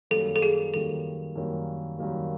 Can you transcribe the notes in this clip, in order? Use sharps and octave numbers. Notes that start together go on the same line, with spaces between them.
F#2 D#3 G3 A#3 A4
A4
G#4
F#2 D#3 G3 A#3 A4
F#2 D#3 G3 A#3
F#2 D#3 G3 A#3